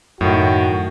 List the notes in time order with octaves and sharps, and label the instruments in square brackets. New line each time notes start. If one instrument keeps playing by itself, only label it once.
[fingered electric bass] F#2 [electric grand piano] A2 D#3 [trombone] F#4